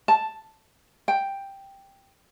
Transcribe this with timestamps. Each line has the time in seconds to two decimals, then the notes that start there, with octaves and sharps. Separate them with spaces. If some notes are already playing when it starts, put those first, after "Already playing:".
0.08 A5
1.08 G5